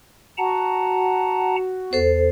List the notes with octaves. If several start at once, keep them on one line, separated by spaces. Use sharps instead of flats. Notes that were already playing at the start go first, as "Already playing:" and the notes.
F#4 F#5 A5 A#5
E2 A4 C5